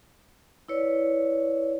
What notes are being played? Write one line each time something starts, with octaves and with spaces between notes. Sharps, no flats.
E4 B4 C#5 D5